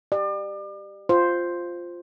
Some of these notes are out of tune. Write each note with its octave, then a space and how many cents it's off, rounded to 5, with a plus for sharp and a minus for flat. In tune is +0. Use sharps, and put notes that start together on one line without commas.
G4 +0 D5 +35
F4 +0 C5 +0